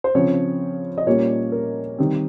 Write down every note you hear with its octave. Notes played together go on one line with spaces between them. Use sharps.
C5
C#3 F3 C4 C#5
D#5
A#2 G3 A#3 C#4 C#5
A#4
D#3 G3 C4